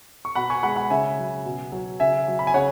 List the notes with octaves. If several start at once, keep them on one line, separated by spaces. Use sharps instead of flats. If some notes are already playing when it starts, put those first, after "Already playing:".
C#6
B2 F#5 B5
G#5 C#6
G#3 F#5 B5
F#5 B5
C#3 E5 G#5
F#3
B2
F#3
C#3 E5 G#5
F#3
B5
G#5
C#3 C#5 F#5